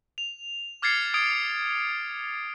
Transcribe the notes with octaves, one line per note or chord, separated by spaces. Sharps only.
F7
D6 F6 G#6 A6 C7 C#7
D#6 G#6 D7